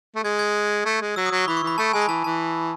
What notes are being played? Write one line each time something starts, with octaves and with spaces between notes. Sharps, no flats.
A3
G#3 G#6
G#6
A3
G#3
F#3 E6
D#6
F#3
C#6
E3 B5
C#6
E3 B5
A3 A5
G#3 G#5
B5
E3 A5
E3 A5